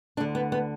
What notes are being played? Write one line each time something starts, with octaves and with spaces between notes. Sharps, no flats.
D2 D3 D4
B3
B3